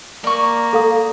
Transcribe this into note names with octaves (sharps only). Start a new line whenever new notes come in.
A#3 D5 C#6
A4 F5 D#6